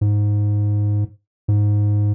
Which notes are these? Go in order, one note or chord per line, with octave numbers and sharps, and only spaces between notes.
G#2
G#2